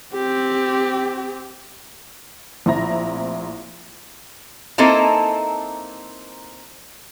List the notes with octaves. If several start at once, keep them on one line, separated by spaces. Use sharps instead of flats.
C4 G4
A#1 A2 C4 E4 A#5 A#6
A#3 C4 D#4 E4 A4